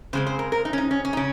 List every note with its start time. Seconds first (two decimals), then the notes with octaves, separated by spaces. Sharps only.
0.13 C#3 G#3 C4 C5
0.27 C5
0.39 A#4
0.52 A#4
0.65 D#4
0.73 C#4
0.78 D#4
0.91 C#4
1.05 C#4
1.13 D#4
1.17 C#3 C#4